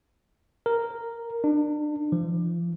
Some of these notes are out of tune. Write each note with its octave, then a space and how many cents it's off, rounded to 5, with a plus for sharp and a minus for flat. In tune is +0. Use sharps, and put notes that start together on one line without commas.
A#4 -5
D4 +30
F3 -40